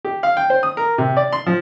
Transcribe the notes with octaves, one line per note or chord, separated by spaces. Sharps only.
G4
F5
G5
C5
D#6
A#4
C3
D5
C6
F3